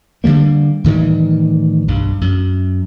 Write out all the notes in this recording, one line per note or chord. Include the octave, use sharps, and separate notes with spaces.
D3 F3 G3 A#3
A2 D#3 E3 G3
B1 G2
F#2